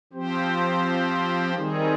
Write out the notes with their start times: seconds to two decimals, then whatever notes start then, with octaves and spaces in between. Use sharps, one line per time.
0.13 F3 C4 G4 C5
1.54 D#3 G3 C4 D#4 G#4